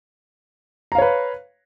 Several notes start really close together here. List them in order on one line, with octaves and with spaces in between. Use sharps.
A#5 F5 C#5 B4